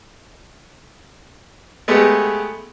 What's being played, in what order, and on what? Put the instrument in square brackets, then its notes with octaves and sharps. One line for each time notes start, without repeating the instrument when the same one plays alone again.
[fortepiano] G#3 A3 B3 G4